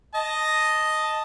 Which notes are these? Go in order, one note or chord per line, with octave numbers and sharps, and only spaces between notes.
D#5 A5